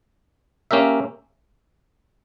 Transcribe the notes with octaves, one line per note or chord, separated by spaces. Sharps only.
A#3 C#4 G4 A#4 E5